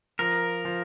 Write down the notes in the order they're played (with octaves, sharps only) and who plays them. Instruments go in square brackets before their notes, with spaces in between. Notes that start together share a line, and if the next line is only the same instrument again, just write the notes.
[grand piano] F3 [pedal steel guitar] A#4
[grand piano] F3